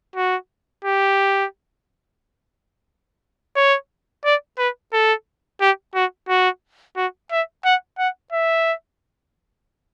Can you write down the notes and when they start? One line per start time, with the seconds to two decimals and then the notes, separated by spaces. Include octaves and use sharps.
0.16 F#4
0.84 G4
3.56 C#5
4.25 D5
4.59 B4
4.93 A4
5.61 G4
5.95 F#4
6.29 F#4
6.96 F#4
7.31 E5
7.65 F#5
7.98 F#5
8.32 E5